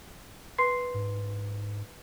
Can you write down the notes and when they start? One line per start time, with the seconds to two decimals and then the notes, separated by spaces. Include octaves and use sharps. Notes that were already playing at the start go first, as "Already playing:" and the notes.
0.58 B4 C6 C7
0.94 G#2